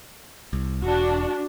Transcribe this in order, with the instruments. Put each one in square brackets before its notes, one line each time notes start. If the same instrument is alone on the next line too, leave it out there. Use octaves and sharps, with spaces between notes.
[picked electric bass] C2
[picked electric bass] E1 [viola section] D4 F#4